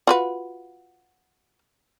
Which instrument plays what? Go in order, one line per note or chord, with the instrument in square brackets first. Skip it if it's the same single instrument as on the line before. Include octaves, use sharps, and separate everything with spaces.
[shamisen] F4 F#4 B4